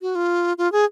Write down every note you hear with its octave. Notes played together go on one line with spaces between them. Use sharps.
F#4
F4
F4
G#4